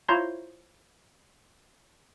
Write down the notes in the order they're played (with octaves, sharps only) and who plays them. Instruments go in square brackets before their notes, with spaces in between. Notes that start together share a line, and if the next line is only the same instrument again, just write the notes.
[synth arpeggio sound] E4 F4 C5 C#5 A#5 C6